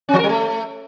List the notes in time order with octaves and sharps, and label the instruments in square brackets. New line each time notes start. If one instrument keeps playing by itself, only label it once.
[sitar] C#4
F3
A#4
G3
A3